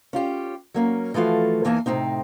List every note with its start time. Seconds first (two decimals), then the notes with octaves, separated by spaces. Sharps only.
0.13 C#4 F4 G4
0.74 F#3 A#3 C#4
1.14 E3 F3 A3 F4 F#4
1.65 E2 E3 A#3 D#4 G#5 A5
1.86 A2 C3 A#3 C4 D#4